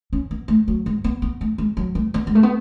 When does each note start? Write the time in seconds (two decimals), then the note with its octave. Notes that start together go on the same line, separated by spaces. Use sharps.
0.13 C#4
0.31 B3
0.48 A3
0.68 F#3
0.86 G#3
1.04 B3
1.22 B3
1.41 A3
1.58 G#3
1.77 F#3
1.95 A3
2.14 B3
2.27 G#3
2.35 A3
2.43 B3